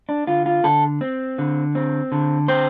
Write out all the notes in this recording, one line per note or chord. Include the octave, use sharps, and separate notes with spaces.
D4
D3 F4
F4
D3 A4
C4
D3
C4
D3
C4 C5